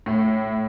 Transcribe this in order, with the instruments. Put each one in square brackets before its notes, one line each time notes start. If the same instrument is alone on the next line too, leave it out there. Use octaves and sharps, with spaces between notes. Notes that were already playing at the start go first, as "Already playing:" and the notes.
[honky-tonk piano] A2